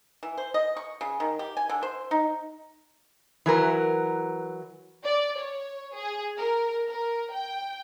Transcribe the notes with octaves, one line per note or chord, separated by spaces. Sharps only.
E3
C5
D#5
C#6
C#3
D#3
G4
G#5
D3
C5
D#4
E3 F#3 A#4 B4
D5
C#5
G#4
A#4
A#4
G5